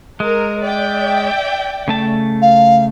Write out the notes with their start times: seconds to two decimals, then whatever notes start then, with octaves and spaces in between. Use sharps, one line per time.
0.20 G#3 A#4
0.62 D5 E5 G5
1.88 C#3 A3 A5
2.42 F5